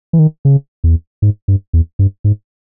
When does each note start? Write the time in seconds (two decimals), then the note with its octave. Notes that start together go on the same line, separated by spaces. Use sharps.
0.13 E3
0.19 D#3
0.45 C#3
0.84 E2
1.22 G#2
1.48 G2
1.73 E2
1.99 G2
2.24 G#2